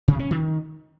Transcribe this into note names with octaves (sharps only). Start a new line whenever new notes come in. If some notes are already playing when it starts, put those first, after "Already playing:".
C3
C#4
D#3